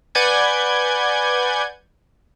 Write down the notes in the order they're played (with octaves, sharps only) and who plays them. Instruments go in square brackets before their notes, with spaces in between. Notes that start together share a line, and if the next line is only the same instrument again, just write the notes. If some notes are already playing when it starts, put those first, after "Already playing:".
[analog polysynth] B4 D5 F#5 G#5 G6 G#6